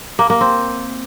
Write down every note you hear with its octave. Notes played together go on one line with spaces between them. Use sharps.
A#3
A#3
C4